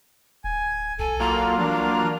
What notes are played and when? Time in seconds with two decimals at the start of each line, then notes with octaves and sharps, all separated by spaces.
0.44 D1 G#5
0.99 B1 A4 G#5
1.20 F#3 A#3 F4 A#5
1.58 E3 D4
1.73 A#5